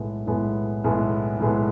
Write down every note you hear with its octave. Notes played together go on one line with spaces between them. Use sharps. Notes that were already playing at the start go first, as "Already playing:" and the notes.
Already playing: B1 A2 G#3 B3
B1 A2 G#3 B3
B1 A2 G#3 B3
B1 A2 G#3 B3